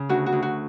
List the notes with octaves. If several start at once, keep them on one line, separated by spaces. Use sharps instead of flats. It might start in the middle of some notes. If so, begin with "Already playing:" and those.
Already playing: C#3
D2 F#4
F#4
D2
F#4